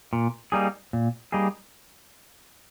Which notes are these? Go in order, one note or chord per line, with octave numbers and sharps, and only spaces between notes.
A#2
G3 A#3 D#4 G#4
A#2
G3 A#3 D#4 G#4